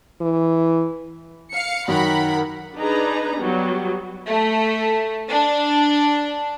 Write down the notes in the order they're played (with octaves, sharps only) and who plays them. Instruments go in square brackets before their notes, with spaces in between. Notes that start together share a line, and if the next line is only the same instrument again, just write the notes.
[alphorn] E3
[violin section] F5 C#7
[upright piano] F#2 D#3 [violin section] A#4 F#5 B5
[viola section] D4 D#4 G#4 B4 A#5
F#3 G3 B3
[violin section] A3
D4